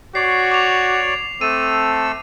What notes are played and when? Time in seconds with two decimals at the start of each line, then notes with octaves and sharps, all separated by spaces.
0.15 F#4 C#5 D5 C7
0.52 D6 F7
1.41 A3 C4 A4 E6 D#7